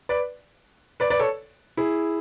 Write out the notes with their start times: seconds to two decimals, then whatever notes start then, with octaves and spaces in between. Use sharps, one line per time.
0.09 B4 D5
1.00 B4 D5
1.10 B4 D5
1.19 A4 C#5
1.77 E4 G#4